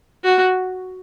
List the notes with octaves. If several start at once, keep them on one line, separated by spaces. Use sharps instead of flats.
F#4